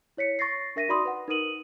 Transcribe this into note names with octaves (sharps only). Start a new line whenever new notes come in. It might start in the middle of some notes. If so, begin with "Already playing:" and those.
E4 C#5 B6 C#7
C#6 A6 A#6 C7
D4 A#4 E5 A#6 B6 D#7
D#4 F#4 D5 B5 C6 D#6
B4 F#5
D#4 A#4 B4 D#6 D#7 F#7